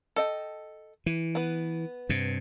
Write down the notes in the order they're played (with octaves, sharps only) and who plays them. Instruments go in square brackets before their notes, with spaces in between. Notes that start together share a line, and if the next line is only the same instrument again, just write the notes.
[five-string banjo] A4 D#5 G5
[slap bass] E3
[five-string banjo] B3 B4
[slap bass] G2 C3